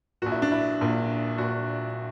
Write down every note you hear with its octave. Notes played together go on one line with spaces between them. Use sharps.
A#1 A#2 F#4
E4
D4
E4
A#1 A#2
A#1 A#2 F#4